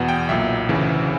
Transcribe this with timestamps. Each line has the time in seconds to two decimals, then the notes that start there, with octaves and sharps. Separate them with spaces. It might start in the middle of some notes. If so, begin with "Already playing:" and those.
Already playing: E2 B2 F#5
0.08 G5
0.29 B1 A#2 E5
0.69 D2 C#3 E3